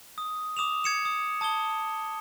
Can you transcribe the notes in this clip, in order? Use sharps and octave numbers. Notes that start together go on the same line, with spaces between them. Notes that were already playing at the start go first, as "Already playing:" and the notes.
D#6
D6 D#6 E7 F7
G#6 C#7 E7
D#6
A5 D#6 G#6 G7